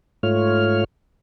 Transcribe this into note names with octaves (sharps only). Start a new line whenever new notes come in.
G#2 A3 F4 C#5 F6